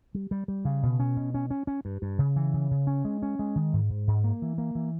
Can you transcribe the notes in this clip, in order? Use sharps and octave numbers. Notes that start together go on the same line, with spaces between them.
G3
G3
G3
C#3
B2
C#4
B2
C#4
C#4
C#4
G2
G2
C#3
E3
C#3
C#3
C#4
G#3
C#4
G#3
D#3
G#2
G#2
G#2
A#3
E3
A#3
E3